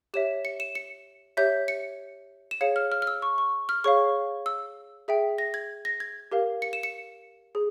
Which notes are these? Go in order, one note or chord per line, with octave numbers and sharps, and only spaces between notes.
G4 C#5 E5 E7
C#7
E7
C#7
G4 C#5 E5 G6
C#7
E7
G#4 C#5 F5 C#7
F6
F6
F6
E6
C#6
C#6
F6
G#4 C#5 F5 C#6
E6
G#4 E5 G5
A#6
G#6
A#6
G#6
G4 A#4 F5
C#7
E7
C#7
G#4